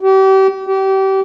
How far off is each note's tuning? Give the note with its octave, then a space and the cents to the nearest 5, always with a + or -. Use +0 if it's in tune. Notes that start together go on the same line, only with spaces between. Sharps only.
G4 -35
G4 -30